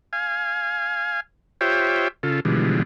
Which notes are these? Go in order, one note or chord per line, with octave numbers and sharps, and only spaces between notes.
F5 G#5
F4 G4 C5 C#5 E5 G5
C#3 F4 A4
B2 D3 E3 F3 G3 G#3